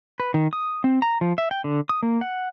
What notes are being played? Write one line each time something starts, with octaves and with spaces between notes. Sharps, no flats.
B4
D#3
D#6
C4
A#5
F3
E5
G5
D3
D#6
A#3
F#5